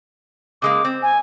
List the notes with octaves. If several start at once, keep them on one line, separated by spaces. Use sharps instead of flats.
C#3 G#3 A#3 D6
C4
G#5